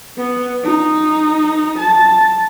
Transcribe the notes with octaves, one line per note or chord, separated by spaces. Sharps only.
B3
D#4
A5